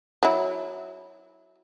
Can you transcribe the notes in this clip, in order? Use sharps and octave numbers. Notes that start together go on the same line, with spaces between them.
F#3 E4